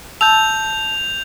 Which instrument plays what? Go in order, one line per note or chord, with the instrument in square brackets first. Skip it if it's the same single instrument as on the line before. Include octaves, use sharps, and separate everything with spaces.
[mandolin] A5 E6 [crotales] G6 F7